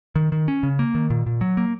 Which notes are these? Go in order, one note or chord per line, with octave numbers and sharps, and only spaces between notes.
D#3
D#3
C#4
C#3
A#3
D#3
A#2
A#2
F#3
A#3